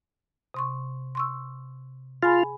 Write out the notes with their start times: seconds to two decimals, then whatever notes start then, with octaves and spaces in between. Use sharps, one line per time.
0.54 C3 C6 C#6
1.15 C6 C#6 E6
2.23 F4 G#4 G#5 B5